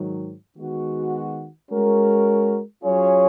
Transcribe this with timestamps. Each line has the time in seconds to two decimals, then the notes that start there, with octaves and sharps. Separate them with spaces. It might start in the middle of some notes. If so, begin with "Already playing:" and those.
Already playing: G#2 D#3 F#3
0.56 D#3 G#3 B3 F#4
1.70 G#3 C#4 F#4 A#4
2.84 F#3 C#4 F4 G#4 C#5